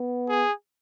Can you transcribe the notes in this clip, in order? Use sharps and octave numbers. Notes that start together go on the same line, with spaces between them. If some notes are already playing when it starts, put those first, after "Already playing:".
Already playing: B3
G#4